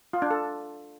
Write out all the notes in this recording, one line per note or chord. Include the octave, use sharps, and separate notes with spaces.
F4
D4
A4